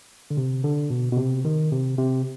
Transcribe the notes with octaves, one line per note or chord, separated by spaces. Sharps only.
D3
C3
D3
B2
B2
C3
D#3
C3
C3